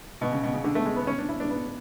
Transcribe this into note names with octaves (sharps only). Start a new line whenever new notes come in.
B2
C#3
B2
C#3
D3
A3
G#3
B3
C#4
D4
E4
D4
B3